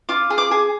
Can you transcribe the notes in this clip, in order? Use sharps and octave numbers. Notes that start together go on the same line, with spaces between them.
F4 D6
G#4
D6
G#4